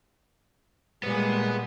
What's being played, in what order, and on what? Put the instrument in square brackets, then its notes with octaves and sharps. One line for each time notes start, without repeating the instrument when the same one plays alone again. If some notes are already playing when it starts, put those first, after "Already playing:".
[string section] A#2 G#3 [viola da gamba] G3 [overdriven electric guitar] B3